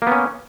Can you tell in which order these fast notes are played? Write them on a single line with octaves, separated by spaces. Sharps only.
A#3 B3 C#4